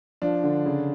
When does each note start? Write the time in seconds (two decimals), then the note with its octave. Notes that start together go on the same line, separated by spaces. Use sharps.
0.22 F3 D4
0.43 D3
0.66 C#3